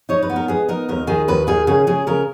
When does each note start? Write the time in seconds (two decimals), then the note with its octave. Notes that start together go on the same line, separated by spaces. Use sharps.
0.09 D#4 C#5
0.22 B4
0.30 B3
0.36 A#4
0.48 B3 G#4
0.69 D#4 A#4
0.89 D#2 A#4
1.07 D#3 G#4
1.28 D#2 B4
1.47 D#3 G#4
1.67 C#3 G#4
1.87 C#3 G#4
2.07 C#3 A#4